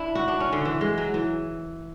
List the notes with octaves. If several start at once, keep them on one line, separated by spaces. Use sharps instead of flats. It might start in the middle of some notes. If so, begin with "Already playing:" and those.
Already playing: D4 E4
F#4
D4
C#4
D3
E3
G#3
F#3
E3